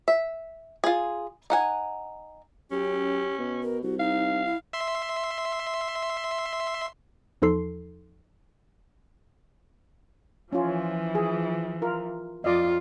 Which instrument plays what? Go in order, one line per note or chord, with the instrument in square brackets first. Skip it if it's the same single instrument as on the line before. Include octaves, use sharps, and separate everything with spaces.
[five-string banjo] E5
F4 G#4
D#4 F#5 G#5
[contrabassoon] F#2 [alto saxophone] C#4 [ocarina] G4
[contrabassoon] B2
[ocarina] A#4
[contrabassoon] C2 [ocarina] F#4
[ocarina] D#4 [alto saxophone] F5
[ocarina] E4
[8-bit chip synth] E5 C6
[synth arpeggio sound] E2 F3 D#4 A4 C6 C7
[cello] E3 F3 [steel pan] C#4 F4
[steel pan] G#4
F4 A#4
[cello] F2 F4 [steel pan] D5 D#5